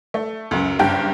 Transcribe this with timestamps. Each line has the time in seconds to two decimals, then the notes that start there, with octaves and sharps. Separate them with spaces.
0.14 A3
0.51 C#2 F#2
0.79 F#1 G2 G4 G5